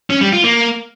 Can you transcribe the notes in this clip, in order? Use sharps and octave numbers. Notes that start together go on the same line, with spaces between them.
C#4
G3
F4
A#3